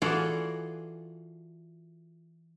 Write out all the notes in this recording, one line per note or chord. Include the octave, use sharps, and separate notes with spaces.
E3 F4 F#4 G#4 A4 D5